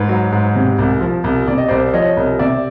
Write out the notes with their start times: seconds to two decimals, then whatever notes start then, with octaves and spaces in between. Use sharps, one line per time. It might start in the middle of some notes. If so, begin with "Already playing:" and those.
Already playing: G#2 B4
0.09 F#3
0.32 G#2
0.55 C3
0.78 C2
1.01 F3
1.24 C2
1.47 C3 D5
1.58 D#5
1.68 C2 C5 D5
1.93 F3 C#5 D#5
2.17 C2
2.39 C3 D5 E5